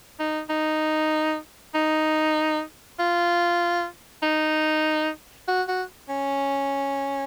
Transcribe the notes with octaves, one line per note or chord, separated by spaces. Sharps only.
D#4
D#4
D#4
F4
D#4
F#4
F#4
C#4